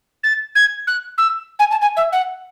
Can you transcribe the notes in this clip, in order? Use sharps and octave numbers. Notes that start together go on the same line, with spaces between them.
A6
G#6
F#6
E6
G#5
A5
G#5
E5
F#5